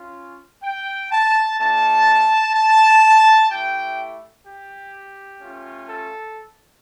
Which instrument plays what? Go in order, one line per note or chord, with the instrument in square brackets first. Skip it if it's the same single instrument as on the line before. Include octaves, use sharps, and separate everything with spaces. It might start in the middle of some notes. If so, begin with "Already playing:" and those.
Already playing: [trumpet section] C#4 F4
G5
A5
A3 D4 F4 A5
A5
A3 E4 G4 G5
G4
A3 C#4 F4
A4